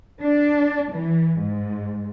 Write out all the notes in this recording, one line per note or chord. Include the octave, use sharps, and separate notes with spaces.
D4
E3
G#2